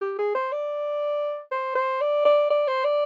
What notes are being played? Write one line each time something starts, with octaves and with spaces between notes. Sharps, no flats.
G4
G#4
C5
D5
C5
C5
D5
D5
D5
C5
D5